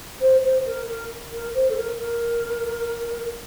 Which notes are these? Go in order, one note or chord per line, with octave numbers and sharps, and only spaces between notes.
C5
C5
A#4
A#4
A#4
C5
A4
A#4
A#4